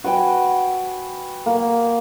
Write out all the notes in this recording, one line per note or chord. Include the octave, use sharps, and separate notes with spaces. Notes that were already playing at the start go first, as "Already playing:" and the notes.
F#4 B4 G5 G#5
A#3